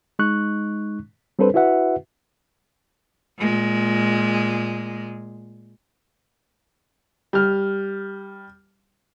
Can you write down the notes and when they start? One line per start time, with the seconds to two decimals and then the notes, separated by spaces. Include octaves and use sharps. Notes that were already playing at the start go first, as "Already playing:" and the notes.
0.19 G#3 D#4 C#6 F#6
1.39 G3 C4 D4 A4 B4 C5
1.54 E4 F#4 B4 E5 F#5
3.38 A#2 G#3
7.33 G3 F6